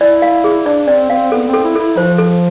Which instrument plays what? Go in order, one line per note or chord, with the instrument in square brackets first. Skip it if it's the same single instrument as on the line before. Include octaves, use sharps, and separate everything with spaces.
[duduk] E4 [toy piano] D5
[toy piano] F5
G#4
[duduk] D4 [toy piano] D5
[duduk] C4 [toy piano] D5
[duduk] C4 [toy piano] F5
[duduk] B3 [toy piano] A4
[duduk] C4
[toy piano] A4
[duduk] E4
[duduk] E4 [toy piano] A4
[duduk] F3 [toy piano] C5
[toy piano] A4